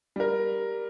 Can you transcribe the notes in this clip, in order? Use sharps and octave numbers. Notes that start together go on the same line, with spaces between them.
G3 A#4